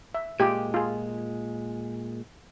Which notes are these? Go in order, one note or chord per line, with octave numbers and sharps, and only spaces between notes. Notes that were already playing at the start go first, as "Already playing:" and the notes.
E5
A#2 G#3 F4 G4
F4 G#4